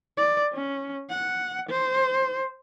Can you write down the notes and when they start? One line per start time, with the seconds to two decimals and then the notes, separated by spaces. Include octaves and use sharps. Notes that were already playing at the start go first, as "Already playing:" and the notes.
0.18 D5
0.54 C#4
1.10 F#5
1.69 C5